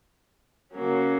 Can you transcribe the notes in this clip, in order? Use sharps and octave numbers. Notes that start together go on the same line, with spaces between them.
C#3 F#3 A#3 C#4